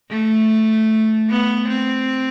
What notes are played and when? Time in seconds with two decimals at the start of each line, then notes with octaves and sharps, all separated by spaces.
0.10 A3
1.30 B3
1.69 C4